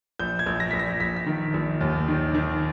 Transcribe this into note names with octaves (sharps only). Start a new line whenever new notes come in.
A#1 G6
G#6
A#1
A#6
A#1 B6
A#6
A#1 B6
B6
D#3
A#1
D#2
D#3
D#3